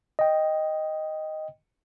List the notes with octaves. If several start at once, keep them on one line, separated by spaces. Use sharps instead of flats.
D#5 G5